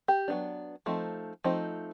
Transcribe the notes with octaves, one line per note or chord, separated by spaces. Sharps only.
G4
F#3 B3 D4
F3 A3 C4 D#4
F3 A3 C4 D#4